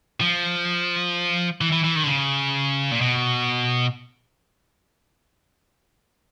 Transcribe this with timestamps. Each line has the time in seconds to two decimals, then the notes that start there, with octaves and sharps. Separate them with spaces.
0.20 F3
1.61 E3
1.72 E3
1.84 E3
1.96 D#3
2.03 D3
2.07 C#3
2.91 A#2
3.01 B2